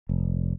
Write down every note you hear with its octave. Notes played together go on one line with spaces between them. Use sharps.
F1